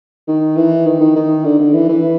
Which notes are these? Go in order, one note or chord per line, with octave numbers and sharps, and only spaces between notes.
D#3
E3
D#3
D#3
D#3
D3
D3
E3
E3